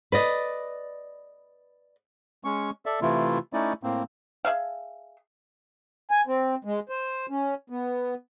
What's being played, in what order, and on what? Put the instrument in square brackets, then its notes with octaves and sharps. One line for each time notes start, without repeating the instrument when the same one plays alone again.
[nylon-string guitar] B4 D5 D#5
[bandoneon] G#3 C#4 C#6
A4 D5 E5
C3 E3 A3 E4 F4
A3 C#4 D#4 E4 D5
A2 A#3 C4
[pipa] G#4 E5 F5
[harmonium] G#5
C4
G#3
C5
C#4
B3